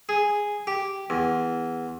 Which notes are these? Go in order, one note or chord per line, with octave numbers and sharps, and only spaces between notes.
G#4
G4
E2